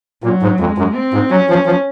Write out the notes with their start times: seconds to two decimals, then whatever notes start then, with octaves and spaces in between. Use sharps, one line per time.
0.24 A#2 F#3
0.42 G#2
0.59 F2 G#3
0.78 F#2
0.95 C4
1.14 G#2
1.31 F#3 C#4
1.49 F3
1.66 F3